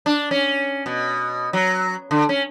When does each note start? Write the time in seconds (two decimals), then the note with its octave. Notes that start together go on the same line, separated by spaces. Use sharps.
0.06 D4
0.31 C#4
0.86 B2
1.53 F#3
2.11 D3
2.29 C#4